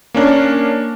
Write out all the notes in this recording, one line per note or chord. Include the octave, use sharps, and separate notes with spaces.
A#3 C#4 D4 A#4